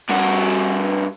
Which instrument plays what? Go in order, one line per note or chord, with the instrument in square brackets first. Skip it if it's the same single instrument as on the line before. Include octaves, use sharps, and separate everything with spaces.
[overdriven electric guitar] G2 F#4